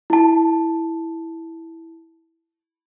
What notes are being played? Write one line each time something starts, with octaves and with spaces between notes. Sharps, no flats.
E4 A5